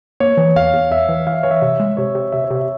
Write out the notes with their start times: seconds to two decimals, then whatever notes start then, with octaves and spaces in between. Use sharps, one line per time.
0.20 A#3 C#5
0.37 E3
0.56 E2 F5
0.73 E2
0.91 E2 E5
1.09 E3
1.27 E3 F5
1.34 E5
1.43 E3 C#5
1.51 E5
1.62 C3 E5
1.80 G#3
1.97 C3 C#5
2.15 C3
2.32 C3 E5
2.45 C#5
2.50 C3
2.55 E5